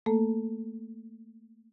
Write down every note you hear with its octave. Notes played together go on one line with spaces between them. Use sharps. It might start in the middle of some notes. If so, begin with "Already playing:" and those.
A3 A#3 A4